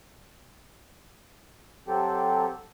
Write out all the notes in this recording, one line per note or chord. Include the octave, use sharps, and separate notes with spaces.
F#3 C4 G4 A4